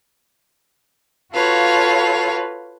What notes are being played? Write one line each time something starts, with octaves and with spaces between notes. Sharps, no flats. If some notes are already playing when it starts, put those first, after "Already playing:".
F4 F#4 A4 B4 C#5 F5